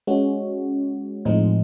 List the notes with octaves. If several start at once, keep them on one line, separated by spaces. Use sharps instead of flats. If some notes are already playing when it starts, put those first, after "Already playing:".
G#3 C#4 F#4
A2 F3 G#3 C4 D#4